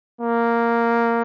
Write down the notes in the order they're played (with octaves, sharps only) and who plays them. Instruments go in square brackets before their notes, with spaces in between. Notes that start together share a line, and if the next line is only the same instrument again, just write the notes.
[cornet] A#3